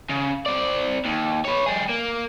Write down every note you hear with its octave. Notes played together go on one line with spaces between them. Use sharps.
C#3
C4 D5
D#2
B4 C#5
G3 G#4
A#3